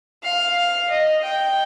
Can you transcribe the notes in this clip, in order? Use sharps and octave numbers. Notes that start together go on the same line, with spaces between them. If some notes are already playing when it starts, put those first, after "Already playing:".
F5
F5
D#5
G5